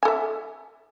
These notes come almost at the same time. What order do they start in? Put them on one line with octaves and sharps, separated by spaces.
G#5 A4 E5